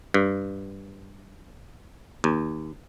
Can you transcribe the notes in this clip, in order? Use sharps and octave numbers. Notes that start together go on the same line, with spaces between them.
G2
D#2